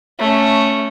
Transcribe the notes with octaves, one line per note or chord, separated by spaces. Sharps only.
A3 C#4